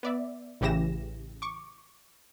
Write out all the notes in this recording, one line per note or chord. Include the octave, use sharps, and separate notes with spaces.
B3 D5 E5
A1 C#3 E3 G4 A#6 E7
C#6 D6